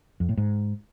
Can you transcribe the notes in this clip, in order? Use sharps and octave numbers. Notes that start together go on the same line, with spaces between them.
F2
A2
G#2